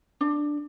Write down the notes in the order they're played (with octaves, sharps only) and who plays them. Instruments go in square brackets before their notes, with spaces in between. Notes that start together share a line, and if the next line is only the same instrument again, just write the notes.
[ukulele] D4